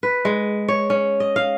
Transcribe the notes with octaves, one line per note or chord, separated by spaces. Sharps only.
B4
G#3
C#5
C#4
D#5
F5